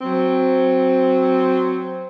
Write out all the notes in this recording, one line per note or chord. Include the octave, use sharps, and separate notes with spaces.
F#3 C4